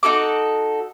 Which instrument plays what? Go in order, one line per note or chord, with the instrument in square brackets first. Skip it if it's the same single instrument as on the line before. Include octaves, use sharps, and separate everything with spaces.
[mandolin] D#4 F#4 A4 D6